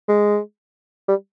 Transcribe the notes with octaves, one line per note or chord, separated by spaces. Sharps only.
G#3
G3